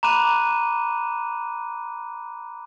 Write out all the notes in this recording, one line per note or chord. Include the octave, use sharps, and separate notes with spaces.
A#5 B5 D6 F#6 D#7